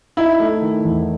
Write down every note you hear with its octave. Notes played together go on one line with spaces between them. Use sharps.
D#4 E4
A3
D#3
E2